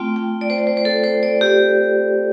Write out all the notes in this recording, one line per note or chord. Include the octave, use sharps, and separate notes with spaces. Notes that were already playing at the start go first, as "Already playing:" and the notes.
Already playing: A3 C4 F4 G5
G5
D5
C5
D5
C5
C5
A4
C5
D5
G4